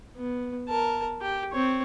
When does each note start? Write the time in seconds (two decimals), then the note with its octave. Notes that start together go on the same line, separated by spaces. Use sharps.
0.16 B3
0.69 A#4 A5
1.22 G4
1.52 C4 C#5